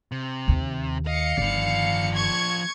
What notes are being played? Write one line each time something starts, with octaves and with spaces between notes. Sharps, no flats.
C3
D#2
D#5 F5 C#7
G1 D#3 F3 D5
C#6 G#6